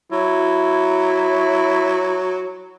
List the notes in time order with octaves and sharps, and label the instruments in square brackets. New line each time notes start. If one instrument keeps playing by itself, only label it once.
[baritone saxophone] F#3 [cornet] E4